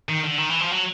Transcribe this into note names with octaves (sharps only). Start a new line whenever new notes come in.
D#3
D3
D#3
E3
F3
F#3